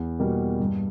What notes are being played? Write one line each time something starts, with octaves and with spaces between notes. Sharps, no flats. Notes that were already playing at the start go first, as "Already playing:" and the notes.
Already playing: E2
B2 G3 A#3
G2